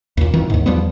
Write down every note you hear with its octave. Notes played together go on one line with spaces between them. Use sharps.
D#2 A#2
F2 D#3 E3
D#2 G#2
E2 F3 G3 B3